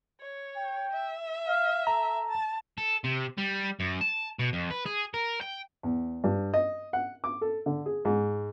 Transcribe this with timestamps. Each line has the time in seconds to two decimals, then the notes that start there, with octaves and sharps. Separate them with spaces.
0.20 C#5
0.56 G5
0.92 E5
1.48 F5
1.87 A4 A#5
2.29 A5
2.78 A4
3.04 C3
3.38 G3
3.80 F#2
4.01 A5
4.39 B2
4.53 F2
4.71 B4
4.86 G#4
5.14 A#4
5.41 G5
5.83 E2
6.24 G2
6.54 D#5
6.93 F#5
7.24 D6
7.41 A4
7.66 D3
7.86 G#4
8.05 G#2